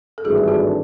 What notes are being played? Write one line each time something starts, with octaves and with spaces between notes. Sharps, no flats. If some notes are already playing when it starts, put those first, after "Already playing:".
A4
G#1 G2 E3 A3 D4 F#4 G#4
G4
F#4 G#4